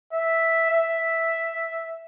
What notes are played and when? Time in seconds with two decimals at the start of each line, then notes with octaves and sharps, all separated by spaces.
0.13 E5
0.71 E5